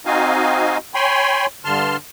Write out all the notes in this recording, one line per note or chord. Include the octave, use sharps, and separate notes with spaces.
C4 D#4 F#4 D#5 F5 G#5
C#5 G5 G#5 B5 C6
G2 D3 A5 C6 F6